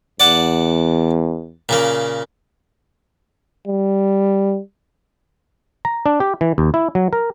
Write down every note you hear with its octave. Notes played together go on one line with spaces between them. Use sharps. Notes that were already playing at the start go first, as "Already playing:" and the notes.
E2 D5 F#5 A5
A#2 C#3 A#3
G3
A#5
D4
G4
E3
D#2
E4
F#3
A#4